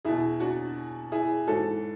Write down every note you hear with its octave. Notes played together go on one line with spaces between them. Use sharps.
E2 B2 E4 G#4
D4 F#4
E4 G#4
G#2 E3 F#4 A4